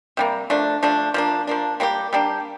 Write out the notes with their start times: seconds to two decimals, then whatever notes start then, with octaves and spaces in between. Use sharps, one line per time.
0.17 C3 G3 A#3
0.50 F3 A3 D4
0.83 F3 A3 D4
1.14 F3 A#3 D4
1.47 F3 A#3 D4
1.80 G3 A#3 D4 G4
2.13 G3 A#3 D4 G4